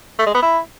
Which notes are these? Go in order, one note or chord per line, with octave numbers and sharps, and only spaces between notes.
A3
G#3
B3
E4